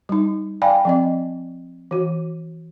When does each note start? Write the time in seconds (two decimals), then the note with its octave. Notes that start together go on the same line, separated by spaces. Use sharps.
0.09 G3 D#4
0.62 D5 F5 G5 G#5 B5
0.85 F3 C4 D#5
1.91 E3 F#4